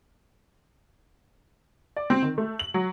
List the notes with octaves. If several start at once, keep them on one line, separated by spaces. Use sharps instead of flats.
D5
C4
D#3
A3
F#7
F#3